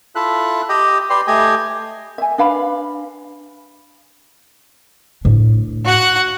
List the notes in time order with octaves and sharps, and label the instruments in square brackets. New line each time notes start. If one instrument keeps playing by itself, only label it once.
[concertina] E4 F4 A4 E5 F#6
G4 D#5 G5
G4 B4 D5 G5 C6
A3 G4 D#5 G5 G#5
[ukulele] E5 G#5
D4 B4 F5 B5
[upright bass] A2 D4
[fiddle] F#4 F#5